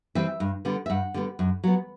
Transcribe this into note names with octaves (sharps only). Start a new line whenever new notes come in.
E3 G3 C4 E5
G2
D3 G3 B3
E5
G2 F#5
D3 G3 B3
F#2
F#3 B3